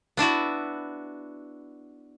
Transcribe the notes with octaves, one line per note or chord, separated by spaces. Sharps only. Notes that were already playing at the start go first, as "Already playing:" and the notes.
B3 D4 E4 F#4